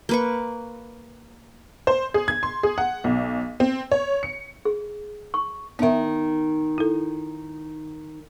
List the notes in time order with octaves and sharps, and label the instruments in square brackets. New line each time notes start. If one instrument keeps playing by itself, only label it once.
[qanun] A#3 B4 C#6
[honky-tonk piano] C5
G#4
G#6
C6
G#4
F#5
B1
C4
C#5
C#7
[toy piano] G#4
C#6
[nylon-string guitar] D#3 D#4 [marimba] B3 E5
[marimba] E4 A4